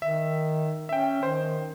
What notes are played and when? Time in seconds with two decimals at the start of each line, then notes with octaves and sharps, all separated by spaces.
0.02 D#3 E5
0.89 C#4 E5 G5
1.23 D#3 C5